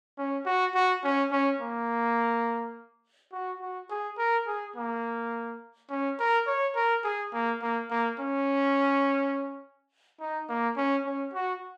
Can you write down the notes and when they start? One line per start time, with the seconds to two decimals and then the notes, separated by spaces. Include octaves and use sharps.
0.18 C#4
0.46 F#4
0.75 F#4
1.04 C#4
1.31 C#4
1.60 A#3
3.32 F#4
3.60 F#4
3.90 G#4
4.18 A#4
4.46 G#4
4.76 A#3
5.90 C#4
6.19 A#4
6.47 C#5
6.75 A#4
7.04 G#4
7.33 A#3
7.62 A#3
7.90 A#3
8.20 C#4
10.20 D#4
10.49 A#3
10.77 C#4
11.06 C#4
11.33 F#4